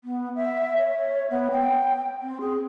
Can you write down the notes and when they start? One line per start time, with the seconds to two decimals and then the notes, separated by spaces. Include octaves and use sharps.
0.04 B3
0.36 E5
0.78 C#5
1.31 B3
1.51 G5
2.22 C4
2.41 G#4